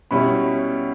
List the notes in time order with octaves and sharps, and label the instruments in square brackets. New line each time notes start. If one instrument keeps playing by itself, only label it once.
[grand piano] B2 G3 C#4 E4 B5